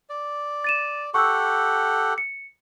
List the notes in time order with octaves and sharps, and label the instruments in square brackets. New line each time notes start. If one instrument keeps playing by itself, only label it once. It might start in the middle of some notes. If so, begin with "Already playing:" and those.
[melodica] D5
[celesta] A6 D#7 E7
[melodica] G4 A4 F#5 [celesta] C#6 E6
[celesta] C#7